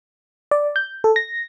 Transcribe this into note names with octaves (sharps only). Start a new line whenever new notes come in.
D5
G6
A4
A#6